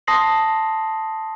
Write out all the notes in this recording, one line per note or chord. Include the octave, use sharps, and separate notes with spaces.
A5 C6 D#6 A#6 C7 F#7